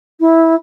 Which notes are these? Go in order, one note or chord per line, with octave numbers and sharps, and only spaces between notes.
E4